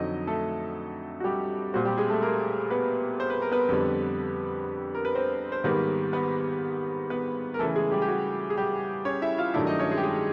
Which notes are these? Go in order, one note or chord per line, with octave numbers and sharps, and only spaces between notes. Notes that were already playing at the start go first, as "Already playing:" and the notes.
Already playing: F2 D3 F#3 D#4 D#5
A3 A4
F#4
G3 G4
A#2 G3 C4 F#4
G3 G4
G#3 G#4
A3 A4
A#3 A#4
B3 B4
C5
B4
A#4
B3 B4
F2 D3 G3
A#4
B4
C4 C5
C5
G#2 D#3 G3 A#3 B3 B4
B3 B4
B3 B4
A#4
C#3 E3 A3 A4
G#3 G#4
G3 G4
G4
F#4
G#4
G3 G4
C#4 C#5
E4 E5
F4 F5
G2 D#3 F#3 A3 D4 E4 E5
D#4 D#5
C#4 C#5
G#3 G#4
G4
G#3 G#4